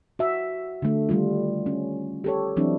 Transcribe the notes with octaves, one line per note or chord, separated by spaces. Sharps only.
F#4 E5
D3 A3
D#3 G3 A3 F4
C#4
G4 A4 C#5
E3 F#3 C4 D4 E4